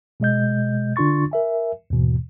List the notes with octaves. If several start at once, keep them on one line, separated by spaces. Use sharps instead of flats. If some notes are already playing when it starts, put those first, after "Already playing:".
B2 G#3 D#5 G6
D3 D4 F4 C6 C#6 A6
A#4 E5 G#5
D#2 G#2 B2 E3